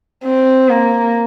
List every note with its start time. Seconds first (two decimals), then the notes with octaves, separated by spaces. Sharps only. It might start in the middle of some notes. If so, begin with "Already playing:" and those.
0.25 C4
0.69 A#3